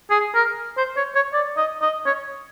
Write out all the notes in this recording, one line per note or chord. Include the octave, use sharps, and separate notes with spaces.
G#4
A#4
C5
C#5
C#5
D5
D#5
D#5
C#5